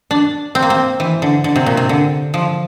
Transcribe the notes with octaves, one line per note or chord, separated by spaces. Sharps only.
D4
C4
A#3
C4
E3
D3
D3
C3
A#2
C3
D3
F3